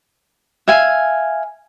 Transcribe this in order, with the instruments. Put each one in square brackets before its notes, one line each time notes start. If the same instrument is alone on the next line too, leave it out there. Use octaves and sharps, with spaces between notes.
[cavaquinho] E5 F5 G#5